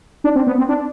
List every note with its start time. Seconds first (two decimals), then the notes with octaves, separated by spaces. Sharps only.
0.24 D4
0.35 C4
0.47 B3
0.58 C4
0.69 D4